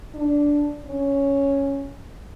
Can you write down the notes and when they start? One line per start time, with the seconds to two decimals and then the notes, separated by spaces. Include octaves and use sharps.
0.14 D4
0.85 C#4